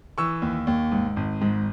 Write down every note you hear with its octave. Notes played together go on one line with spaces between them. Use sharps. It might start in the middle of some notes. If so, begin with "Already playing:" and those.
E3 C#6 E6
D#2
D#2
G#2
G#1
G#2